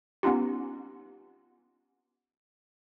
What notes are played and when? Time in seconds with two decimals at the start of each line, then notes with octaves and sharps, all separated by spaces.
0.23 B3 C#4 D#4 F4 G4